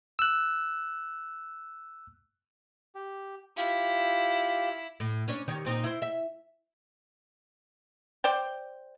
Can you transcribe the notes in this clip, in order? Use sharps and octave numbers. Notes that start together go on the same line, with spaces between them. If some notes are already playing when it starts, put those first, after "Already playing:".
E6 F#6
G4
E4 F4 G4
A2
C#4 D4 C#5
D#3 G4 C#5
A#2 C4 D#4
E4 C5
E5
C5 D5 G5